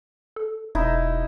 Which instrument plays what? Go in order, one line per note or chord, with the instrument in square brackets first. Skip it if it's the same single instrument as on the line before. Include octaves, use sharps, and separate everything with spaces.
[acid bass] A4
[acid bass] E1 [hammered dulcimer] D#4 E4